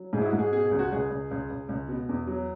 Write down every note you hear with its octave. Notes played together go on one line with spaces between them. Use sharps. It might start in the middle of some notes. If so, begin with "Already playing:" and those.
Already playing: F#3
G#2 G#4
E4
F#4
G#2
G#4
B2 G#4
G#4
C#2
F#4
C#2 G#4
C#2
C#2
C#2
C#2
B2
E2
F#3